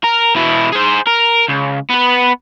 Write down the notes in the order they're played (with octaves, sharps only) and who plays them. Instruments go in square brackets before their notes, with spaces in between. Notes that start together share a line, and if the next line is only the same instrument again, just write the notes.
[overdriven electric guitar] A#4
B2 E4
G#4 C5
A#4
C#2
B3 B4